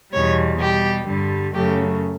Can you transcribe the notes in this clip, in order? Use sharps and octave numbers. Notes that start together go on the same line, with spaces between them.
E2 B2 G3 C#5
B2 G3 G4
G2 D3 G3
F#2 C#3 F#3 A3 G4